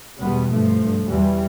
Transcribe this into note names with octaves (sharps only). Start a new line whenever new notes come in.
E2 B2 G3 B3
G2 F3 A3
G2
E2 B2 E3 G3